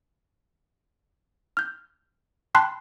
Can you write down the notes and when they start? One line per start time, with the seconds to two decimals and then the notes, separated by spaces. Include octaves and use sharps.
1.57 F6 G6
2.55 G5 A5 B5 C6 F#6 C7